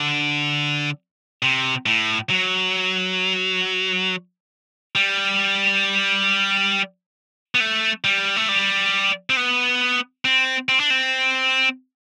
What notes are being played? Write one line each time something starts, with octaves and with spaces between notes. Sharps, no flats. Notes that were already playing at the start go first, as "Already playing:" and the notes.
Already playing: D3
C3
A2
F#3
G3
B3
A3
G3
A3
G3
C4
B3
C4
C4
D4
C4